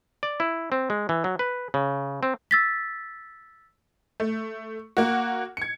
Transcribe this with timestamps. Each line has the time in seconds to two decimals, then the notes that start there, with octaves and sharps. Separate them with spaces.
0.23 D5
0.40 E4
0.72 C4
0.90 G#3
1.09 E3
1.24 F#3
1.39 B4
1.74 C#3
2.23 C4
2.51 E6 A6 B6
4.20 A3
4.97 A#3 F#4
5.57 G#6 C#7